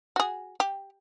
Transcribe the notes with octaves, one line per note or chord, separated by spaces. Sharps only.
F#4 G#4
G4